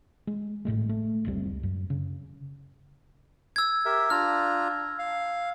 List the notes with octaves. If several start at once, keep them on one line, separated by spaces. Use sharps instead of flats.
G#3
G#1 A2 G#3 A3
A3
F#1 C#2 G3 C4
F#2
C#3
E6 G#6
G4 A#4 E5
D4 F4 A#5 F6
F5